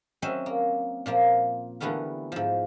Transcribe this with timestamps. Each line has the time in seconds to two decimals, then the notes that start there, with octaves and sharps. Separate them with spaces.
0.22 F#3 C4 C#4 C5 D#5 E5
0.46 A#3
1.06 A#2 F3 A#3
1.80 D3 E3 G3 A3 B3 A#4
2.32 G#2 F3